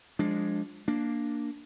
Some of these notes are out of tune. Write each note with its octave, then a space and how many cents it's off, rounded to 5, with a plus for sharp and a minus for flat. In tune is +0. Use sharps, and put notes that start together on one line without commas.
F3 +25 G#3 -5 D4 +0
A#3 +0 D4 +0